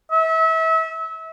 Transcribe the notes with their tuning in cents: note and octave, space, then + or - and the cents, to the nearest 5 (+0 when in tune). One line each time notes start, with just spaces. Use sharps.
E5 -30